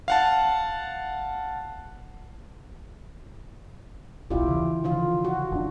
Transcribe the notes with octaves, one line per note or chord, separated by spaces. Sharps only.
F5 F#5 A5
D#1 B1 E4 F4 G4
C#3 E3
D3 F3 F4
F#4
F#1 D4